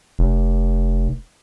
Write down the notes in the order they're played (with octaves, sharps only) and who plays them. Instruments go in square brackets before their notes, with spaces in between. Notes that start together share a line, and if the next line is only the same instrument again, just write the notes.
[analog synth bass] F1